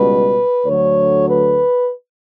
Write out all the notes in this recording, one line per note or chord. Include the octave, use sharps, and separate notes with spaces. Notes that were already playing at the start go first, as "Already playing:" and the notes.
Already playing: C#2 B2 G3 B4
D2 D3 F#3 C#5
B4